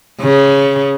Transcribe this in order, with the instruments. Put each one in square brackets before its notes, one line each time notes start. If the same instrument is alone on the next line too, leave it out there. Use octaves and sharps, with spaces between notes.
[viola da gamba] C#3